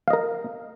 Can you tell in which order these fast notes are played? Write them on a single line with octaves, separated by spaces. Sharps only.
F5 D#5 A#4